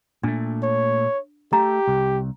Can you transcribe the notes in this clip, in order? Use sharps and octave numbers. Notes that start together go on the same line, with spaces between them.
A#2 A3 D4
C#5
A3 G4 A#5
C2